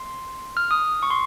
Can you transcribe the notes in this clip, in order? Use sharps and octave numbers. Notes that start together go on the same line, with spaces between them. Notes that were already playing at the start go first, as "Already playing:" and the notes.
Already playing: C6
F6
D#6
C#6
C6